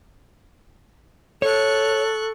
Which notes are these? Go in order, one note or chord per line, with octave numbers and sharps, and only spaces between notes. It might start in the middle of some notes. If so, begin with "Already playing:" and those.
A4 C#5 C#6 F#6